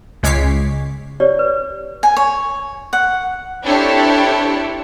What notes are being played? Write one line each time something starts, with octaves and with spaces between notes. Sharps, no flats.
C#2 G#3 C#5 D6 B6 C7
G4 C#5 D5
B4
G#5
C#5
F#5
C4 D4 E4 G4 A4 C#5